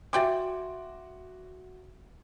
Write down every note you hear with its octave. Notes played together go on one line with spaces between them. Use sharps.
F#4 D5 E5 G5 G#5 C6 D6